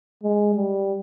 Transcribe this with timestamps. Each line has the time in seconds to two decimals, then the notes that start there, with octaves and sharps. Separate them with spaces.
0.23 G#3
0.55 G3